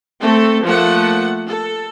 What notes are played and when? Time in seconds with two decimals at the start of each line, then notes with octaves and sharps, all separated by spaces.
0.20 A3 C4 A4
0.64 F3 A3 A#3 F#5
1.46 A4